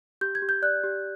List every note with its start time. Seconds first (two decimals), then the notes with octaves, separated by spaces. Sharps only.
0.21 G4 G6
0.35 G#6
0.42 G4
0.49 G6
0.62 D5 F#6
0.84 G4